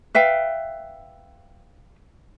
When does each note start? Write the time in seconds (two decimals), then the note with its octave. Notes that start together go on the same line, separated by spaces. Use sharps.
0.15 B4 E5 F5 G5